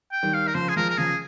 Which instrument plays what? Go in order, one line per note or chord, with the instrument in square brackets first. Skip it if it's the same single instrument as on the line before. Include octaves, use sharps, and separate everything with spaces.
[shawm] G5
[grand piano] D#3 G3
[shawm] F5
A#4
[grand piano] C#3 F3 [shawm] C5
[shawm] G#4
[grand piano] F3 G#3 [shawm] A#4
[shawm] A#4
[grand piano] C#3 F3 [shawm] G#4